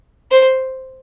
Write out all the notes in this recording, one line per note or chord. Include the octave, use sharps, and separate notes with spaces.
C5